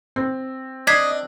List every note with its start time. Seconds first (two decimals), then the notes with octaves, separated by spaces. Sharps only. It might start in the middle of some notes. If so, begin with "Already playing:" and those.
0.16 C4
0.87 D4 D#5 G#6 B6 C7